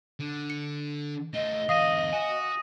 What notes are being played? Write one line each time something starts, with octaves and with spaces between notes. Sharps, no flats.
D3
C#7
A3 F4 D#5
E2 D3 F5 D#6 A#6 D#7
F#4 G#5